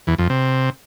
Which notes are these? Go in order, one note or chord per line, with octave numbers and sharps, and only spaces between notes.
E2
F2
C3